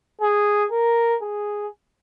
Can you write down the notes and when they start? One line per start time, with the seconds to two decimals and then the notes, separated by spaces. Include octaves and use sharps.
0.21 G#4
0.72 A#4
1.22 G#4